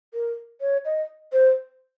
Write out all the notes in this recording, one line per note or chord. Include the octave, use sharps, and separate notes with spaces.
A#4
C#5
D#5
C5